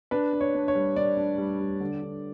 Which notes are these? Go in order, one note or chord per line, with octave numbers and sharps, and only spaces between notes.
D4 B4
D4
C#5
D4
C#5
G3
D4 D5
D4
G3
G3
D3
D3